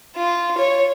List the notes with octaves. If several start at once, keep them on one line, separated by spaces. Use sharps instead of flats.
F4
C#5